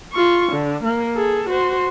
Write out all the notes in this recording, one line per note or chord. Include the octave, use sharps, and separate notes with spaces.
F4 C#6
D3
A#3
G#4 A4
F#4 C5